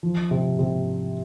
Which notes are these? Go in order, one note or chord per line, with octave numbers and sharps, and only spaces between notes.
F3
C3
C3